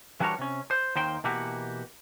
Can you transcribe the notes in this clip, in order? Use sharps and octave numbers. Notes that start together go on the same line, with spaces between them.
E3 G3 D4 F#4 A#4 C#5
C3 C#4
C5
D#2 D#3 C5 G5
B2 E3 A#3 F#4 G4